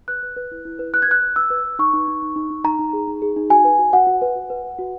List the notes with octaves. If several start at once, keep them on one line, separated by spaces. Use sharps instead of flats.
B4 F#6
B4
B4
E4
E4
B4
B4 F#6
G#6
B4 F#6
B4
B4 E6
B4
B4
D#4 C#6
D#4
D#4
D#4
D#4
D#4
D#4 A#5
D#4
G#4
D#4
G#4
D#4
F#4 G#5
B4
F#4
F#4 F#5
F#4
B4
F#4
B4
B4
F#4